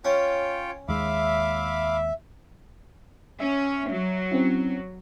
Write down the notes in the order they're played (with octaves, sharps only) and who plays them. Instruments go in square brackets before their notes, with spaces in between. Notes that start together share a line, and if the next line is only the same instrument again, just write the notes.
[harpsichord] C#4 [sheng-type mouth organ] F4 C#5 G5
[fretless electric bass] D#2 G#3 [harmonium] E5 [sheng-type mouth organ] F5 B5 D6
[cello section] C#4 [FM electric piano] E5
[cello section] F#3
[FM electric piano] C4 C#4 E4